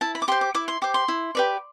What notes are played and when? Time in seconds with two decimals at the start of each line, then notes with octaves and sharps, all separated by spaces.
0.01 E4 A5
0.15 B5
0.22 D6
0.28 G4 C5 C6
0.41 D6
0.55 E4 D6
0.68 C6
0.82 G4 C5 D6
0.94 C6
1.08 E4
1.35 G4 B4 D5